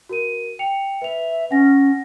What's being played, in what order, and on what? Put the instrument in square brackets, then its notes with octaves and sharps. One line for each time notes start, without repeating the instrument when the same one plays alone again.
[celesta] F#4 A#4 D#7
G5 C#7 F7
[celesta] B4 F7 [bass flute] E5
[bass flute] C#4 [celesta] F#5 G#5 A#6